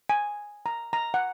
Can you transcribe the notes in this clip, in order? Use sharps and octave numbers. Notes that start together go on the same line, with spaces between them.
G#5
A#5
A#5
F#5